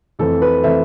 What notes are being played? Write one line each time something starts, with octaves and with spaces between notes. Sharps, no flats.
F2 E3 A3 C4 A4
B4
E3 A3 C4 E5